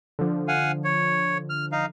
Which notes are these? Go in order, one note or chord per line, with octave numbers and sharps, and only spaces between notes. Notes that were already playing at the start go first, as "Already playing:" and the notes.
D3 F3
F5 F#5 G#5
C#5
F6
D#4 F5